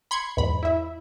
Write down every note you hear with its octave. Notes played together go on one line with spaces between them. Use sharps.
B5 C6 G#6 C#7
E2 G#2 B5
E4 E5